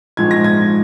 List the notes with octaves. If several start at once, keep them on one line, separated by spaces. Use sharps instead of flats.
A#1 G#2 F3 G#3 G#6
A#6
G#6